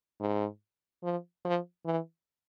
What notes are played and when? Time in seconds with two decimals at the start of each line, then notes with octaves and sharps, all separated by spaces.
0.20 G#2
1.03 F3
1.45 F3
1.86 E3